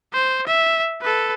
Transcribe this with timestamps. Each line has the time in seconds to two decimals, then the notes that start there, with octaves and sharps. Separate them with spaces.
0.13 C5
0.47 E5
1.02 A4 B4